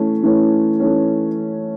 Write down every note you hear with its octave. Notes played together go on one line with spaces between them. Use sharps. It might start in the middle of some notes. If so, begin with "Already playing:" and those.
Already playing: E3 A3 C#4
E3 A3 C#4
E3 A3 C#4